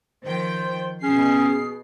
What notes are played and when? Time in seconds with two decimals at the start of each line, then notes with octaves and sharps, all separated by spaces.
0.24 D#3 F3 C5 G5
1.03 B2 C#4 G#4 C7